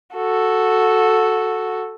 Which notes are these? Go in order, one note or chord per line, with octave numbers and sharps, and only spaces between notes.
F#4 A4